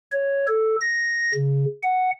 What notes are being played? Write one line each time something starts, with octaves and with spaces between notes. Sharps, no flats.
C#5
A4
A#6
C#3
F#5